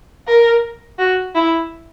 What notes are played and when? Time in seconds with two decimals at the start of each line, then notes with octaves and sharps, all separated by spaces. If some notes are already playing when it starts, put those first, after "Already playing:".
0.27 A#4
0.99 F#4
1.35 E4